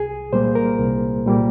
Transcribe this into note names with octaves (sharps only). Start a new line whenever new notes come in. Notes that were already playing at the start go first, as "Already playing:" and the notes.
Already playing: C2 G#4
A#2 G3 A#3 C5
A#4
C2
A#2 G3 A#3